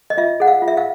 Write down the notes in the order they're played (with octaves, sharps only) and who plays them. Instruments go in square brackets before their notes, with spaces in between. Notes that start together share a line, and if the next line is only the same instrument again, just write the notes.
[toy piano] D#5
F4 E5
G#4 F#5
F5
F4
E5
F5